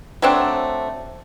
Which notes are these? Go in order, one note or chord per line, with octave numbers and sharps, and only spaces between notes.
F#3 A3 C4 D4